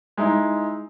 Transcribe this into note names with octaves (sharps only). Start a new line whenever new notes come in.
G#3 D#4 E4